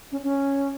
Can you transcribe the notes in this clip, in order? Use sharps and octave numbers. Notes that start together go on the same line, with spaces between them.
C#4
C#4